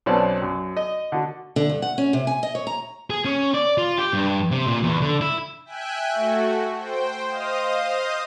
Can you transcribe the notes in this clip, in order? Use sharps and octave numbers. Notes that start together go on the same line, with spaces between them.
B1 B2 C4 C#4 D5 A5
F#2
D#5
D3 F#4
D3
G2
F#5
C#4
C3
G#5
D#5
C#5
A#5
G#4
C#4
D5
F4
G4
G2
C3
A#2
E2
D3
E4
E5 G5 G#5 F#6
A3 F#4
C5 G5
C5 D#5 F5 D#6